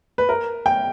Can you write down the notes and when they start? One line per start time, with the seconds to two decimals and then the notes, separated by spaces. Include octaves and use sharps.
0.18 B4
0.29 A#4
0.66 G5